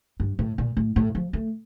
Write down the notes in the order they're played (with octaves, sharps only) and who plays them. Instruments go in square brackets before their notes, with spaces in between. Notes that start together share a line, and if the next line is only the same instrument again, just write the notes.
[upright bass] G2
A2
A#2
A2
A2
F3
A3